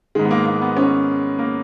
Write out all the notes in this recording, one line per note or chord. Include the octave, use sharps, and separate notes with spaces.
G#2 D#3 G#3
B3
A#3
A#3
B3
C#4
A#3